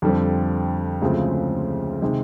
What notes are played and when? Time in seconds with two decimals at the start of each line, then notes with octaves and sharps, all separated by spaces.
0.02 F2 D3 G3 C4
1.02 D2 C#3 F3 G#3 C4
2.02 C3 D#3 G#3